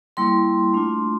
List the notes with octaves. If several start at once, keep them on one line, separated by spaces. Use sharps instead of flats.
G3 A#3 E4 C6
A3 D4 F4